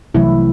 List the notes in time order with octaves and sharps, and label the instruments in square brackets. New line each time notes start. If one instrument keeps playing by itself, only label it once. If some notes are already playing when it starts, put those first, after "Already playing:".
[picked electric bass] C2 C3 F#3 A3 [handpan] E3 E4